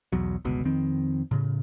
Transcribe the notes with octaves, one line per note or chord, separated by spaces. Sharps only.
B1 E2 F#3
G1 C#2 B2
F2 D#3 C4
A2 C#3